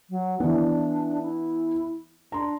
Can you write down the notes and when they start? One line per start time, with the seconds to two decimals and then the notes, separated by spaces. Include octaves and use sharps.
0.10 F#3
0.40 E3 B3 D4
1.22 E4
2.32 D4 A#5 C6